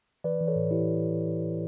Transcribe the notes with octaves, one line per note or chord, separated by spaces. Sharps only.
E3 B4 D5
E3
A4 C#5
A2
E3 E4 G4